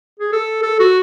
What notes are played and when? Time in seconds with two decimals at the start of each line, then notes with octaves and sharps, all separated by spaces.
0.19 G#4
0.33 A4
0.63 A4
0.80 F#4